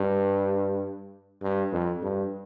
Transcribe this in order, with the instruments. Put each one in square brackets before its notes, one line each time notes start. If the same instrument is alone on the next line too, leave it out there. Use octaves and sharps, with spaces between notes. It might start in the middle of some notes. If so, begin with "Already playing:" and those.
Already playing: [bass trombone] G2
G2
F2
G2